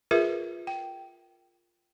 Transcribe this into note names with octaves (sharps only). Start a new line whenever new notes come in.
F4 G#4 A#4 B4 E5
G5